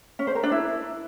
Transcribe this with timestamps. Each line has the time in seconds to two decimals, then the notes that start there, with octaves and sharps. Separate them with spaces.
0.19 C#4
0.27 C5
0.35 A#4
0.43 D4
0.52 E4